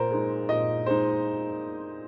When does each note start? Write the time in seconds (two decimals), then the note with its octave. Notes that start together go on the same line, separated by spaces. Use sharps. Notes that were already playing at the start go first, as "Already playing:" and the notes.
Already playing: A#2 A#4 C5
0.11 G#3 D#4
0.49 A#2 D#5
0.86 G#3 D#4 C5